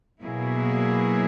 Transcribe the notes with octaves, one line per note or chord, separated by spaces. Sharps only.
B2 F#3 A#3 E4 G#4